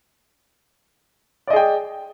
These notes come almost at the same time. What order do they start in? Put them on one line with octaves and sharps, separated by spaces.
D5 D#5 G#4 G5